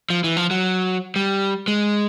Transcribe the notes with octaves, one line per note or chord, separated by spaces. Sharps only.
F3
E3
F3
F#3
G3
G#3